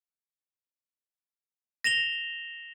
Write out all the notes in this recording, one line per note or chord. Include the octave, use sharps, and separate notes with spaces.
A#6 E7 F7 G7